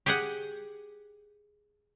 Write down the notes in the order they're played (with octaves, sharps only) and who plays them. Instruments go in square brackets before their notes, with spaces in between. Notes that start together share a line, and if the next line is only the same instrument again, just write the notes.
[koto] G4 G#4 F#5